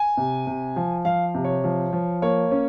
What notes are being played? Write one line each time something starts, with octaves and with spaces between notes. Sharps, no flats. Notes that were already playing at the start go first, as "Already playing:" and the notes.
Already playing: G#5
C3
C3
F3
F3 F5
C3
C#5
F3
F3
A#3 C#5
C#4